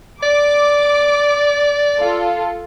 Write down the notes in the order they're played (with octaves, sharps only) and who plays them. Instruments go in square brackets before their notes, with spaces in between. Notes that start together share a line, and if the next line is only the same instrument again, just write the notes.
[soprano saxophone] D5 [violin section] D6
[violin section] F4 A4